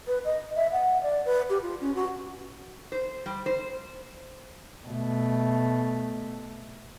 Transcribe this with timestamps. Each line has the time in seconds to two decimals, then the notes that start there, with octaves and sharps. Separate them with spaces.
0.07 B4
0.25 D#5
0.56 E5
0.72 F#5
1.02 D5
1.25 B4
1.50 G4
1.62 F4
1.81 C#4
1.95 F#4
2.92 C5
3.26 G3
3.46 C5
4.87 B2 A3